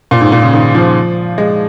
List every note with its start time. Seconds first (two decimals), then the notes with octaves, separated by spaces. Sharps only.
0.11 A#2
0.21 G#2
0.32 A#2
0.42 C#3
0.54 D#3
0.75 F3
1.38 G#3